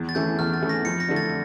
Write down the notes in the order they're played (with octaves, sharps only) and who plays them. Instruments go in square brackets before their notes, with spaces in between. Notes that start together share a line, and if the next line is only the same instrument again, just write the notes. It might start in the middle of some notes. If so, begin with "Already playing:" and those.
Already playing: [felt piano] E2
[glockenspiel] A6
[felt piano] E3 A3 C#4 [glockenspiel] G6
[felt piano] E2 [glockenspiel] F6
[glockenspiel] A6
[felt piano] E3 A3 C#4
[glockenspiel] A#6
[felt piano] F2 [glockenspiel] C#7
[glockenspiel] A#6
[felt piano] D3 A3
[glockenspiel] A6